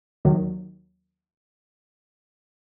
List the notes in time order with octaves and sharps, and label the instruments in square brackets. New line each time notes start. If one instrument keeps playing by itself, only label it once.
[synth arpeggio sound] D#2 D#3 F#3